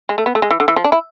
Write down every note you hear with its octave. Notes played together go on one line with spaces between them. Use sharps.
G#3
A3
B3
A3
G#3
E3
D3
E3
F3
D4
E4